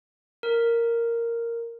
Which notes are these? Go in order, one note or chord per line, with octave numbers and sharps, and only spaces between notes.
A#4